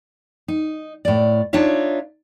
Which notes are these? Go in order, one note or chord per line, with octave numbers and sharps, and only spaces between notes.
D#4
A2 D5
D4 D#4 F4 C#5 E5